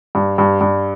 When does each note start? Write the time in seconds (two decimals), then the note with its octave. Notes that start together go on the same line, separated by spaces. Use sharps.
0.15 G2
0.38 G2
0.61 G2